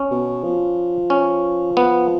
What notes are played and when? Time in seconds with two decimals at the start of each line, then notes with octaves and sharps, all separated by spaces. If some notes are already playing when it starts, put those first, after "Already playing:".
Already playing: C#4
0.11 B2
0.44 F3
1.10 C#4
1.77 B3